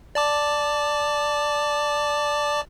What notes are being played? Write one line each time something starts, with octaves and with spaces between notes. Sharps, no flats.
D5 A5 D6